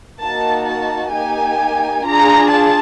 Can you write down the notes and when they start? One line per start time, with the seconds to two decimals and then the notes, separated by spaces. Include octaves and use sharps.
0.21 A#3 D#4 F#4 A5
0.67 A5
1.13 A#3 D#4 G4 G#5
2.05 D4 F4 G#4 A#5
2.50 A5